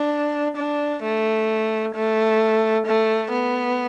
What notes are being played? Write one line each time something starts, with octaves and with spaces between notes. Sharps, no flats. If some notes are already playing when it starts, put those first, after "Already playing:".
Already playing: D4
D4
A3
A3
A3
B3